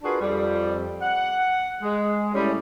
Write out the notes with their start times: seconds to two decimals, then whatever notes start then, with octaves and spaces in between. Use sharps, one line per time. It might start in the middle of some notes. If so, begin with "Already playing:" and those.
0.03 D4 F4 F#4 G#4 A#4 B4
0.20 F2 G3
1.02 F#5
1.81 G#3
2.34 A2 G3 C#4